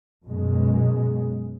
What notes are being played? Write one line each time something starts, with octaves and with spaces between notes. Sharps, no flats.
F#2 B2 G#3